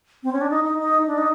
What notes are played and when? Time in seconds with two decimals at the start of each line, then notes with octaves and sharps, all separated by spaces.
0.23 C4
0.33 C#4
0.41 D4
0.50 D#4
0.64 D#4
0.78 D#4
1.07 D4
1.18 D#4